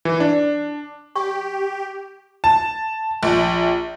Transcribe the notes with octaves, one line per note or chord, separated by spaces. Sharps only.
E3
D4
G4 C#6
A5
A#1